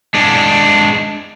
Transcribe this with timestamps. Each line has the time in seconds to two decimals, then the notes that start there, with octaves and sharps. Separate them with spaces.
0.14 G#3 D4